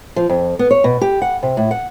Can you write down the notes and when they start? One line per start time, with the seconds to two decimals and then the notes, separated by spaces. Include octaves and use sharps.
0.16 F3
0.29 F2
0.59 B3
0.71 C#5
0.84 B2
1.01 G4
1.22 F#5
1.43 C3
1.57 A2
1.71 F#5